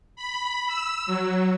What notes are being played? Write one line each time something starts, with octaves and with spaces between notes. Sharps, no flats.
B5
E6
F#3